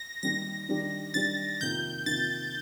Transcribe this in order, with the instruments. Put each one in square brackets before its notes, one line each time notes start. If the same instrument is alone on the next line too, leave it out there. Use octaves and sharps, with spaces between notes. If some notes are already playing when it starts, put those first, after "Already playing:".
Already playing: [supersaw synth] A#6
[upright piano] D#2 D#3 G3 [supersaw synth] A#6
[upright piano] D#3 G3 D4 G4
[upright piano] D#3 G3 D4 G4 [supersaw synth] A6
[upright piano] F2 C3 D#3 A#3 [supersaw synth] G6
[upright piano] F2 C3 D#3 A#3 [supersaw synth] A6